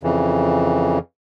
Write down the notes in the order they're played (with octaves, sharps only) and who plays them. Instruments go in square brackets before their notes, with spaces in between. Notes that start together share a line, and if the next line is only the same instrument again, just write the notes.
[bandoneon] F2 C#3 E3